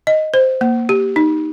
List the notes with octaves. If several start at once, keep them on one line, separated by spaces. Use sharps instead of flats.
D#5
C5
A#3
G4
D#4